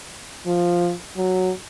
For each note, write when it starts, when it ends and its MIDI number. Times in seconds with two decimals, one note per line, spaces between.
0.46 0.93 53
1.17 1.50 54